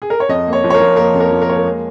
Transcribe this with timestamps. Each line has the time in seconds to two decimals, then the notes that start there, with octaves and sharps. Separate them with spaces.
0.02 G#4
0.10 A#4
0.20 C#5
0.29 F2 D#5
0.47 A#3
0.53 C#5
0.64 F3
0.70 C#5
0.74 A#4
0.80 F3
0.97 A#3 A#4
1.14 F2
1.20 A#4
1.31 F3
1.42 A#4
1.48 A#3 C#5
1.57 A#4
1.64 G#3 G#4